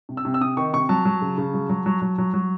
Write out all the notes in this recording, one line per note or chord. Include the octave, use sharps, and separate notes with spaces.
C3
E6
C3
E6
C3 D#6
D#3 C#6
C3 C#6
F#3 A5
F#3
C#3
C#3
F#3
F#3
F#3
F#3
F#3
F#3